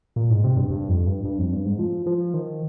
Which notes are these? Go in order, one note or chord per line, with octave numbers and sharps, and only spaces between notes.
A#2
G#2
C3
G2
G2
F2
G2
G2
F2
G2
G#2
F3
F3
D#3